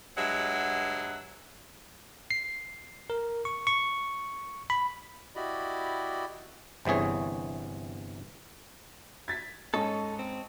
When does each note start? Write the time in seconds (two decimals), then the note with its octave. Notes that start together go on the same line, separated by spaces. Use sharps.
0.18 G2 F#3 G#3 E5 F#5
2.31 C7
3.10 A#4
3.45 C#6
3.67 C#6
4.70 B5
5.36 E4 F#4 G4 D5 D#5 B5
6.85 G1 C3 E3 G#4 C#5
9.28 G#6 A6 B6
9.74 G#2 C#4 A4 D#5 A5 C#6
10.19 C4